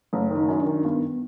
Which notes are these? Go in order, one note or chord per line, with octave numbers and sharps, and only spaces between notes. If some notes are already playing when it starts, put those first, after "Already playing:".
F#1 A3
D#3
D#4
F#2
D4
D#3
G2 B3